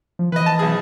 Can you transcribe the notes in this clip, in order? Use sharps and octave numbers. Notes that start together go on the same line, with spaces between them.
F3
E3 B4 D#5
A5
B1 G#4